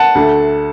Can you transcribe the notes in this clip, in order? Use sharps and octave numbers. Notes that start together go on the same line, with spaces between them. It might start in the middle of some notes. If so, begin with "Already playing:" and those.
Already playing: F#5 A5
D2 D3 A3